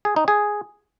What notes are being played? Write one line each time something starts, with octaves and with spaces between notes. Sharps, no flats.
G#4
D#4
G#4